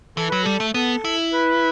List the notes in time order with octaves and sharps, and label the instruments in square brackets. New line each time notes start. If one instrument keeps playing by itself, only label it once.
[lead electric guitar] E3 [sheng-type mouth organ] A4
[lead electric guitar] F#3 [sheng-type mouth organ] B4
[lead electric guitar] G3 [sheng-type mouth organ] A4
[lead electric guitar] A3
[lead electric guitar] B3 [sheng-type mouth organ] A4
[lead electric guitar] E4
[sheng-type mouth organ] B4